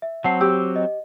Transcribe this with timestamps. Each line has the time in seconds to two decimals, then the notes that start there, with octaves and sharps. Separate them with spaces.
0.02 E5
0.24 F#3 C4 F#5 A5 C7
0.41 G4 D6 E6
0.76 D#5